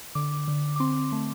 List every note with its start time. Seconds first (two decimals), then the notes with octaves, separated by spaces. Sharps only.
0.15 D3 D6
0.48 D3
0.76 D6
0.80 C4 C6
1.12 A3